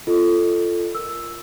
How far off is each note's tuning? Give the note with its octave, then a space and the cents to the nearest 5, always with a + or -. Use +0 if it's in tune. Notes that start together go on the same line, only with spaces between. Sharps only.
F4 -15 A4 +0 D#5 -25
A#4 +0 E6 +0